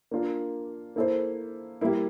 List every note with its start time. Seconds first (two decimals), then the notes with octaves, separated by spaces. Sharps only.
0.11 A#3 D4 F4 A#4
0.96 A#3 E4 A4 C5
1.81 G3 A#3 E4